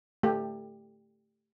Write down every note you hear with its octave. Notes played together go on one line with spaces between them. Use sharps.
A3 G4